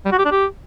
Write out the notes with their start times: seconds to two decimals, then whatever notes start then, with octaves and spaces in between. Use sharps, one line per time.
0.05 G3
0.12 F#4
0.19 G4
0.25 D4
0.32 G4